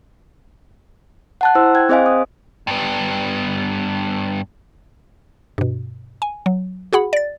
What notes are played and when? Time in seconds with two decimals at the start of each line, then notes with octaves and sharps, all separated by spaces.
1.41 F#5 A5 F#6
1.55 E4 C5 E6
1.75 G5 F#6 G#6
1.89 C4 G#4 C5 D#5 F5 G#5
2.06 D#6
2.67 G2 B3
5.58 G2 B2
6.22 G#5
6.46 F#3
6.93 F#4 G#4 F#5 B5
7.13 D5 A6